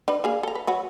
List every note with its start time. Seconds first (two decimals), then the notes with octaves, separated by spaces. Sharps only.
0.08 D4 D#4 B4
0.24 A#3 G#4 F5
0.43 A4 A#5
0.55 B4
0.67 F#3 F#4 B4